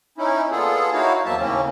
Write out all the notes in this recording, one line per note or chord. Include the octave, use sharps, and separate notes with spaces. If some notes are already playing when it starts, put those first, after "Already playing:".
C#4 D#4 E4
A#2 B3 F4 G#4 A4
D#4 E4 F#4 C#5 F5
E2 F#3 A#3 C4 E5 A5
D#2 A2 C#3 A#3 C4 C#4